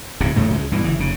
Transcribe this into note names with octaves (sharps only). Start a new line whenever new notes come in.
D1 G#2 C3
D#1 E2 A2 A3
C#2 G#3
G2 B2 E3
F#1 E3
F1 C#3